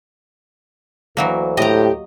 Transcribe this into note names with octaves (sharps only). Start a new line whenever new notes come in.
D2 E3 F#3 A#3
A2 G4 D#5 A#5